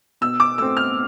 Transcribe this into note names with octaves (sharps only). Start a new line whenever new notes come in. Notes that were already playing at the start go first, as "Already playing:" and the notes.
B2 E6
D6
A3 C4 E6
F6